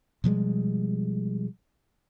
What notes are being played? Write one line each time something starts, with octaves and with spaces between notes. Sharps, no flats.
B2 F3 G3 G#3